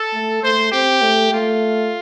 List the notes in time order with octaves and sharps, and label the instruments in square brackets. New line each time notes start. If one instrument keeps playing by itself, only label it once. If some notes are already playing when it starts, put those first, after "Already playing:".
Already playing: [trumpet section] A4
[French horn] A3
[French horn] A3 [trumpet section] C5
[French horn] C4 [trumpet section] G4
[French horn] A3
[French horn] A3 [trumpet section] F4